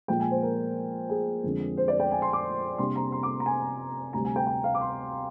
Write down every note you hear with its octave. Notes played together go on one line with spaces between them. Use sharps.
A#2 F3 G#3 G5
G#5
C5
A#4
G#4
F2 D3 G#3 C4
C5
D5
G5
G#5
C6
D6
C3 G3 A#3 D4 C6
A#5
C6
D6
A#5
G#5
D2 C3 G3 A#5
G#5
G5
G5
F5
D6
C6